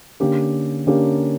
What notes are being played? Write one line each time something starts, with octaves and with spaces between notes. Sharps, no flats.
D3 A#3 C#4 G4 A#4
D3 A#3 C#4 G4 A#4